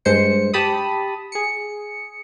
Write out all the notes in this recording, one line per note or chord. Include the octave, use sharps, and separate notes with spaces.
G2 G#3 C5 C#7
G4 A5 B5 D#6
G#4 C#7